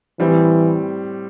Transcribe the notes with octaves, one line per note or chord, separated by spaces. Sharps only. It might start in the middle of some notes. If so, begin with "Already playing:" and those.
A2 E3 G3 C4